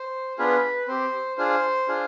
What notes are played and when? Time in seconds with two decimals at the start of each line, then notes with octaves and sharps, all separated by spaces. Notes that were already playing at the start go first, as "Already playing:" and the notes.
Already playing: C5
0.38 B3 D4 F4 G#4 B4
0.88 C4 G4 C5
1.38 D4 F4 G#4 C5
1.88 D4 F4 G#4